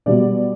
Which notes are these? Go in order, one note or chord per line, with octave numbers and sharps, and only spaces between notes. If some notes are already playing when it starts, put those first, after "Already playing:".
B2 G3 B3 D5